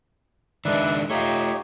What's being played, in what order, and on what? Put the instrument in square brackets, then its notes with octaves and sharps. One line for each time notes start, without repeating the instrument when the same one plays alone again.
[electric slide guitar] D#3 G#3 D4 [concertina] B4 D5 E5
[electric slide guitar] A3 F4 [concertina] D#4 G4 C#5